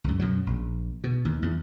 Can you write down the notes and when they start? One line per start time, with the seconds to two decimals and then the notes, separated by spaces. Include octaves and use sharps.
0.04 C#2 F#2
0.19 F#2 B2 F#3
0.47 A#1
1.04 B2
1.25 D#2
1.42 E2